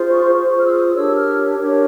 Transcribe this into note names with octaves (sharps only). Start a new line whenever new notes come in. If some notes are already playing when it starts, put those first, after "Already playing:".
Already playing: F4 G#4 C5
C#6
F4 G#4 C5 C#6
F6
E6
D#6
D4 G4 A#4 C#5 E6
F6
D4 G4 A#4 C#5